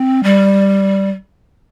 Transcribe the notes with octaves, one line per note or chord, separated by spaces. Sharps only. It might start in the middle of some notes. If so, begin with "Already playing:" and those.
Already playing: C4
G3